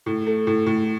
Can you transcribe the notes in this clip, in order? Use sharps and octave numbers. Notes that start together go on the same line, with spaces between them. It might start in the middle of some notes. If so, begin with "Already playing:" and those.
A2
A3
A2
A2